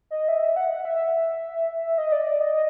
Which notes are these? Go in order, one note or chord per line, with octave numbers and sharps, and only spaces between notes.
D#5
E5
E5
F#5
F#5
E5
D#5
D5
D5
D#5
D#5